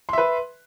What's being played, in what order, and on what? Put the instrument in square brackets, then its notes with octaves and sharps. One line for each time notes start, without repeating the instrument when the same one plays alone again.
[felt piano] C6
E5
B4